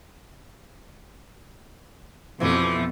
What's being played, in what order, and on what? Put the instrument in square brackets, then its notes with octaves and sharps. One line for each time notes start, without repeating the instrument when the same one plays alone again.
[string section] F2 B2 [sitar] E3 F3 A3